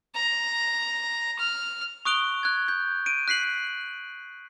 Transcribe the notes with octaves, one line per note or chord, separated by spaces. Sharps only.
A#5
F6
C#6 D#6 F#6 D7 F7 G7
F#6 G#6
G6
D7 D#7
F#6 B6 C7 F#7